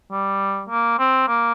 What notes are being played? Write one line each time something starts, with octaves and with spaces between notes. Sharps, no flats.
G3
A#3
C4
A#3